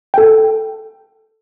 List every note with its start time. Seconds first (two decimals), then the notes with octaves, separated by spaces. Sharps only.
0.14 A4 G5